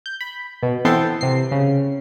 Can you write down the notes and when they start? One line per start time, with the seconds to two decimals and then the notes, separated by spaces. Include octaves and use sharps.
0.06 G6
0.21 B5
0.63 B2
0.85 E3 B3 C4 A4 G5 C6
1.21 C3 C7
1.51 C#3